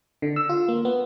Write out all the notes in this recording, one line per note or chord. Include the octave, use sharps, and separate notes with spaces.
D3
E6
F4
A#3
B3